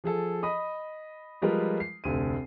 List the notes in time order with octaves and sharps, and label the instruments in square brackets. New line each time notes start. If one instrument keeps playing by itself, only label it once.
[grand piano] F3 G#4 A4
D#5 B5 D#6
F3 G3 G#3 F4 A#4 B4
C7
F1 D2 D#7